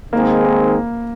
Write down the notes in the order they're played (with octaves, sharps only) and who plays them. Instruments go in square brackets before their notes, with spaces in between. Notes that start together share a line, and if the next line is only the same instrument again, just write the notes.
[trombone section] D#3 G#3 C4 D#4 G#4 [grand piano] A#3
[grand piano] A#3